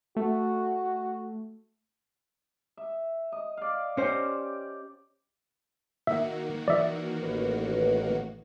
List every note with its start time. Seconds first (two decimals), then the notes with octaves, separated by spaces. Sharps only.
0.17 A3 F#4
2.77 E5
3.32 D#5
3.57 D5 F5
3.97 C#4 G4 C5 D5
6.07 D#3 A#3 F#4 E5
6.68 E3 D5 E5
7.22 A1 B4